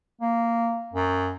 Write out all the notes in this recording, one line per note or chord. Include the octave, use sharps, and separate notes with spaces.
A#3
F#2